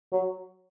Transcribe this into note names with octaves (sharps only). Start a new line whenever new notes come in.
F#3